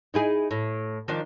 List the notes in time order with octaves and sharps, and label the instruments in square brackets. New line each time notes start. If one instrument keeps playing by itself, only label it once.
[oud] D#4 E4 G#4
A2
D#3 F3 D4